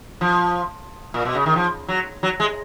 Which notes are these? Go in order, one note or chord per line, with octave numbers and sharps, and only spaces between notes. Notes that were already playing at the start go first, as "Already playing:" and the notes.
F3
A#2
B2
C#3
D#3
F3
F#3
F#3
G#3